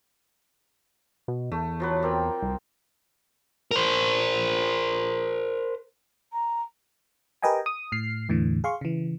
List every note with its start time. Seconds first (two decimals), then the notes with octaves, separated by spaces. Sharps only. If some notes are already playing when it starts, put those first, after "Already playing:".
1.28 B2
1.52 E2 A3
1.80 F3 F#3 B4
2.02 A#3 C4 G5
2.42 C2
3.71 A#4 C5
6.33 A#5
7.42 G4 A#4 B4 D#5 G5 G#5
7.66 D#6
7.92 A2 F6 C7
8.29 E2 A2 D3 E3
8.64 G#4 F5 C6 C#6
8.81 C#3 E3